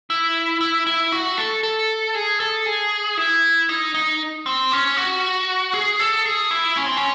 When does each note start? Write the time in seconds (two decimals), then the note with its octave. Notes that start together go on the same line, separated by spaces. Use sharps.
0.10 E4
0.61 E4
0.87 E4
1.12 F#4
1.38 A4
1.63 A4
2.15 G#4
2.40 A4
2.66 G#4
3.17 E4
3.69 D#4
3.95 D#4
4.46 C4
4.72 C#4
4.97 F#4
5.73 G#4
5.99 A4
6.25 G#4
6.51 E4
6.77 C#4
6.86 C4
6.97 C#4